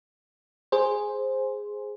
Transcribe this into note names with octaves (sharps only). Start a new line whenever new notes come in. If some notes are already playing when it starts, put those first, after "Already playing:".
G#4 C5